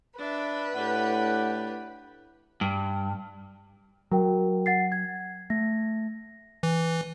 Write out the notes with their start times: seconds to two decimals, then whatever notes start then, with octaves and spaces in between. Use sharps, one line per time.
0.18 D4 B4 E5
0.75 A2 D4 G4 F#5
2.61 G2
4.11 F#3 F#4 A#4 G5
4.66 F#5 A6 C7
4.92 G#6
5.50 A3 A#6
6.63 E3